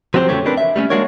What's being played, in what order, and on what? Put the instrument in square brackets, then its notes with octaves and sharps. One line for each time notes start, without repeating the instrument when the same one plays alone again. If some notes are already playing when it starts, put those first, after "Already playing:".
[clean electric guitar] F3 F#3 C4 G4 C5
E2 C#3 A3 G4 C#5
C4 D4 A#4 B4
E5
G3 A3 C4 C#4
G#3 A#3 D4 F#4 A#4 C#5